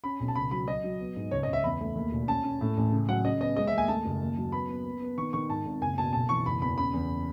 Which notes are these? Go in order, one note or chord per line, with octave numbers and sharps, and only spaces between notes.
C#4 B5
B1
A5
C#2 B5
F#3 B5
F#3 D#5
F#3
B3
G#2
C#2 C#5
D#5
C#2
E5
E2 B5
A3
D#2
E1
C#4 A5
C#4
A2
A1
C#3
F#3 F#5
C#3 D#5
B3 D#5
G#3 D#5
E5
D#2 G#5
A3 A5
F#1
D#2
F#3
B3 B5
B3
B3
B3
D#3 C#6
D#3 C#6
G#2 A5
G#1
F#1 G#5
B2 A5
B1 A5
E3 C#6
F#1 B5
E2 B5
C#3 B5
E2